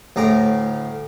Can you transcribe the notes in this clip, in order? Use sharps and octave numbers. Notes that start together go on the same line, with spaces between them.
D2 A2 A#5 D6